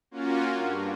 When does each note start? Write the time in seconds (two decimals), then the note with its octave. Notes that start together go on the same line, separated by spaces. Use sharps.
0.11 A#3 C#4 F4 F#4
0.55 G2